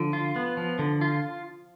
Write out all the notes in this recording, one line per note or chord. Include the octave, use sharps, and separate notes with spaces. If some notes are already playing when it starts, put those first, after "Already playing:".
Already playing: D3 F3
F4
B3
F3
D3
F4